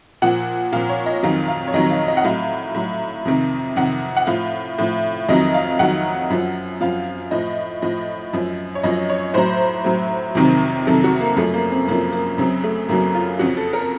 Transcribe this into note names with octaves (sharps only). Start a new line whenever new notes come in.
A#2 F3 F#5
A#2 F3 F5
C#5
D#5
F2 D#3 F#3 F5
F5
C#5
F2 D#3 F#3 D#5
F5
D#5
F#5
A2 F#3 F5
A2 F#3
F2 C3 D#3
F2 C3 D#3 F#5
F#5
A2 F3 F5
A2 F3
F2 D#3 F#3 D#5
F5
F2 D#3 F#3 F#5
F#2 F3
F#2 F3 F5
A2 F3 D#5
A2 F3 D#5
F#2 F3
C#5
F#2 F3 D#5
C#5
A2 F#3 C5
A2 F#3
F2 C3 D#3 F#3
F2 C3 D#3 F#3 A4
F#4
A#3
F#2 C#3 F3 A3
A#3
C4
F#2 C#3 F3 A#3
A#3
F#2 C#3 F#3 C4
A3
F#2 C#3 F#3 A#3
F4
F2 C#3 F3 F#4
A4
A#4